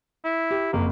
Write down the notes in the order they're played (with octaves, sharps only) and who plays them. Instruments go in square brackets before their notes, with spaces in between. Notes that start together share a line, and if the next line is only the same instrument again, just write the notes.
[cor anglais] E4
[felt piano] G4
[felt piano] F#1 F2 [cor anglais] A#3